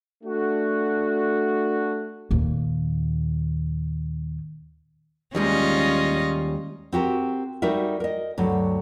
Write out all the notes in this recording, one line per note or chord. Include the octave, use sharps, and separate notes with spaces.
A3 D4 F#4
D#2 A#2
D#2 G3 G#3 C#4 F4 D#5
C4 F#4 G4 A#4
G3 D#4 F#4 A#4 E5
A#4 D#5
D2 G2 F#3